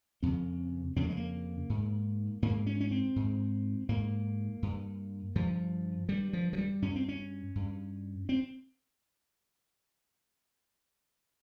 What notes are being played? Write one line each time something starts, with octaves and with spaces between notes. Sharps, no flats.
F2 C#3 C4
F2 C#3 C4
A#3
G#3
A#3
G#2
G#2 A#3
C#4
C#4
C4
G#2
G#2 A#3
G2
G2 F3
G2 G3
F3
F3
G3
G2 C#4
C4
C#4
G2
C4